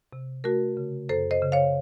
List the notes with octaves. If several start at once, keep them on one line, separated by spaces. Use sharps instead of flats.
C3
A3 F#4 A#4
C#3
F#2 A4 C5
C5 D#5
C#3
C#5 F5